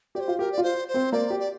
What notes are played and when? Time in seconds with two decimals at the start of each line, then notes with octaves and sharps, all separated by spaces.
0.15 G4 D5
0.20 C5
0.28 F4
0.39 G4 A#4
0.52 D5
0.58 F4
0.63 C5
0.88 C5
0.94 C4
1.12 A#3 D5
1.30 G4
1.40 D5